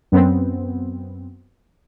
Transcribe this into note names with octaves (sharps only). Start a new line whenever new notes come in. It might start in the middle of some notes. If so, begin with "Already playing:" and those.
F#2 B3 C4